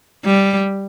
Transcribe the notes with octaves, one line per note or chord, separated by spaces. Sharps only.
G3